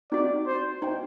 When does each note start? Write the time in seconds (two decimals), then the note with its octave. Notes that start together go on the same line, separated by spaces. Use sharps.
0.12 C4 D#4 F#4 D5
0.47 C5
0.82 D#4 F#4 C5 G5